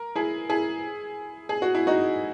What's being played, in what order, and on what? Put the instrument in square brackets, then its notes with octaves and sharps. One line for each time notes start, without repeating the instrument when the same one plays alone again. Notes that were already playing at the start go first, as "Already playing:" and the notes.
Already playing: [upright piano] A#4
E4 G#4
E4 G#4
G#4
F#4
E4
D#4 F#4